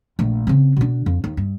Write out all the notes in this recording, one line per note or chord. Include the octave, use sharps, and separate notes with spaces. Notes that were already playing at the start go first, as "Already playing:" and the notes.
A#1 A3
C#3 C4
B2 D4
F2
D#2
G2